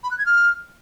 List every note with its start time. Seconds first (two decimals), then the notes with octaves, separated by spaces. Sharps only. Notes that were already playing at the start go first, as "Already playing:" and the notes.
0.04 B5
0.11 F#6
0.18 G#6
0.26 F6